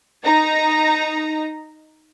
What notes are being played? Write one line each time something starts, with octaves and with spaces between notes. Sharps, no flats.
D#4 A#5